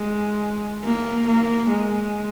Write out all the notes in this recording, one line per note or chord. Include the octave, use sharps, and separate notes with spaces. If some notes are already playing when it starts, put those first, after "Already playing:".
Already playing: G#3
A#3
A#3
G#3